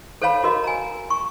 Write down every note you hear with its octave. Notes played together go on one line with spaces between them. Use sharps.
A4 C5 C#5 F5 A5 B5
F#4 A#4 D#5
G#5 A#5
C#6